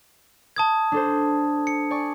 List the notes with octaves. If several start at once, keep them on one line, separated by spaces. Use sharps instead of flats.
A5 D#6 G#6
D4 A4 C5
C#7
D5 G#5 C#6